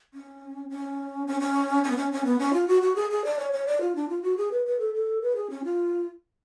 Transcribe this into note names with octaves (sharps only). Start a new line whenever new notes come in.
C#4
C#4
C#4
C#4
C#4
B3
C#4
C#4
B3
C#4
F4
F#4
F#4
G#4
G#4
D5
C#5
C#5
D5
F4
D4
F4
F#4
G#4
B4
B4
A4
A4
B4
G#4
C#4
F4